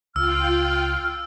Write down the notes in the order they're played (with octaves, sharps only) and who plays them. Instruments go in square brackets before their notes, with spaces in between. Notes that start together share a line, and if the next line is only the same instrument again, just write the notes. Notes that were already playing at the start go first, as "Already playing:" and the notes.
[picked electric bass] C#2 [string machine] F4 G5 [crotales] E6 [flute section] F6